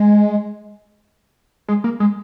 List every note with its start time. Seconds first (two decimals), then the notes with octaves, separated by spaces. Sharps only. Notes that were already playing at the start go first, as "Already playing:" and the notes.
Already playing: G#3
1.68 G#3
1.84 A#3
2.00 G#3